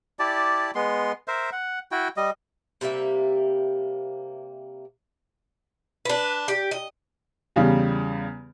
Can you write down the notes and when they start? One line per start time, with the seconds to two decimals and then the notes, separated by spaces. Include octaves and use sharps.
0.19 E4 G4 D5 A5
0.75 G#3 B3 C6
1.28 A#4 C5 E5
1.52 F#5
1.92 E4 F#4 G5
2.17 G3 D#5
2.81 C3 G3 A#3 E5
6.05 D4 B4
6.48 G4
6.71 D#5
7.56 E2 C#3 G3